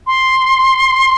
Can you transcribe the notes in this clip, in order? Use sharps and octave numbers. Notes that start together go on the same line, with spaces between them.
C6